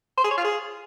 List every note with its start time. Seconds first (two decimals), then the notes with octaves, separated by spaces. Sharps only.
0.17 C5
0.24 G#4
0.31 C#5
0.37 F4
0.44 G#4